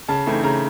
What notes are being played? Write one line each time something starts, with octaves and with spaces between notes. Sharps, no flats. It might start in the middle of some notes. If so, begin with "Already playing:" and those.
C#3 A5
E3 A3 C4 D#4
C#3 A#5